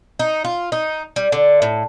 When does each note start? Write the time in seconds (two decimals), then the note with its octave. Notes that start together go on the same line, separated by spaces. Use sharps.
0.19 D#4
0.45 F4
0.72 D#4
1.16 G3
1.32 D3
1.62 A2